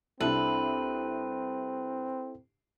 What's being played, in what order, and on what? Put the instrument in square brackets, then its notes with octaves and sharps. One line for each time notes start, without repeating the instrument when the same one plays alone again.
[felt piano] C2 D4 [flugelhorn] C4 [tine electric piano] E4 A4 [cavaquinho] B4